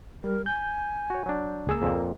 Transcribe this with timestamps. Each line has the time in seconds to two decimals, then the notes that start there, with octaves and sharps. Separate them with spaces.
0.24 G3 A#4
0.46 G#5 G6
1.10 F#4 C#5
1.26 F#3 D4
1.67 C#2 A#3 G#4 E6
1.82 F2 A#2